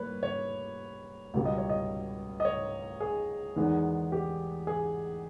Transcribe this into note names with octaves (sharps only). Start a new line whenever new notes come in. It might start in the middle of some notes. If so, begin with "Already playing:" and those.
Already playing: G3 A#3 B4 C#5
C#5
C#2 B2 G3
D#5
C#5
D#5
D#5
C#5
G#4
E2 D#3 G#3 B3
G4
G#4